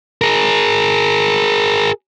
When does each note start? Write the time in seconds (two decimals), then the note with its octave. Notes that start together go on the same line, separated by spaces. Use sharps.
0.22 G#4 A#4